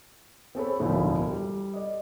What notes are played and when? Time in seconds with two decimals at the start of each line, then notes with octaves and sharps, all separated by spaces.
0.55 C4 G#4 A4 C#5 B5
0.80 E1 D2 A2 F3 A#3 E4
1.30 G3
1.73 D5 D#5